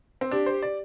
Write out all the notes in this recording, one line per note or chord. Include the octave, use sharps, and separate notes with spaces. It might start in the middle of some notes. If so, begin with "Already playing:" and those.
C4
D4 G4
C5
D5